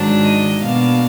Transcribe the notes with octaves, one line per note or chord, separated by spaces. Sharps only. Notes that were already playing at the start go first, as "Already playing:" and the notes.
Already playing: G#2 D#3 F#3 D4
D#5
B2 A#3 D4 F5